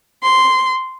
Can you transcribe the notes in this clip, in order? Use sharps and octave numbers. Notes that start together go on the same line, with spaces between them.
C6